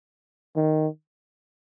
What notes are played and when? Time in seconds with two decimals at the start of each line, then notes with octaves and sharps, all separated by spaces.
0.56 D#3